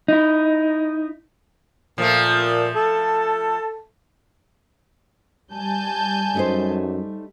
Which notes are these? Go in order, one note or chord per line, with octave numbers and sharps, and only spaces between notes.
D#4 E4
A#2 F3 A3
A4
G3 G#5 A5 G6
F#2 A3 D#4 C5